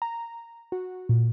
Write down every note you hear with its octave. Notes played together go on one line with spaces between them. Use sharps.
A#5
F#4
A#2